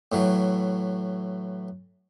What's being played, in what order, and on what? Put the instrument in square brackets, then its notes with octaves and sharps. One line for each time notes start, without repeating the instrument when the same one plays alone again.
[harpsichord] A2 E3 F#3